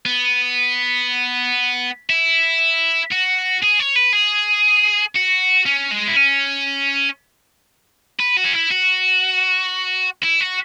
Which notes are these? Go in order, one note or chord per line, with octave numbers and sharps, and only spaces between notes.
B3
E4
F#4
G#4
C#5
B4
G#4
F#4
C#4
G#3
E4
C#4
B4
F#4
C#4
E4
F#4
E4
F#4